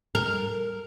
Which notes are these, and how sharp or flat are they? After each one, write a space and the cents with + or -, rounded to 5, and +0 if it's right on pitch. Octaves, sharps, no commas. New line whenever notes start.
A#4 -5